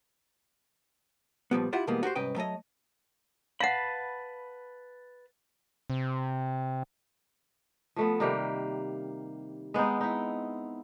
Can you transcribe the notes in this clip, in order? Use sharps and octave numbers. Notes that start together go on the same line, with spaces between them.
A#2 F3 G3 B3
E4 F4 G4 E5 F#5
B2 E3 G3 G#3 A#3 B3
F#4 G4 B4 C5
C2 G#2 C#4 B4 D#5 G5
F#3 A3 C#5 D#5
B4 F5 F#5 A5 B5
C3
F3 A3 B3
C3 D#3 G3 A#3
G#3 B3 C4 D#4
D#4 E4